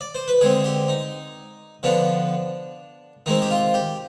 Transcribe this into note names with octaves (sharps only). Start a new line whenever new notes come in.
D5
C5
B4
D3 G#3 C4 G#4
G4
D#4
D3 F3 B3 D4
D#3 G#3 C4 D#4
G4
F4
G4